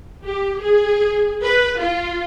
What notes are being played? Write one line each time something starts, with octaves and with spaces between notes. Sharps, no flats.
G4
G#4
B4
F4